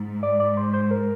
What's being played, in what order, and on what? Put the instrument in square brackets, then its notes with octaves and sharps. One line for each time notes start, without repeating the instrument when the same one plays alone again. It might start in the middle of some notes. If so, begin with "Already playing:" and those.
Already playing: [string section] G#2
[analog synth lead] D5
D5
C5
C5
A#4